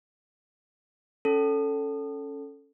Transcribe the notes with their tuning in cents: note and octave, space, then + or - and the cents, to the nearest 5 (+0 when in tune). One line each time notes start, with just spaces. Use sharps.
C#4 +0 A4 +0